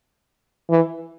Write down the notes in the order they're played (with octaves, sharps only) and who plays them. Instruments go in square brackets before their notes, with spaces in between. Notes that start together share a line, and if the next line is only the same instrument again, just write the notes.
[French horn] E3